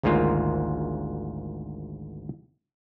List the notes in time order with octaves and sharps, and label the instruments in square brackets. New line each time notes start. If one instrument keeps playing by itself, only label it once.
[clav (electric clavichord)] G#1 D2 G#2 A#3 F4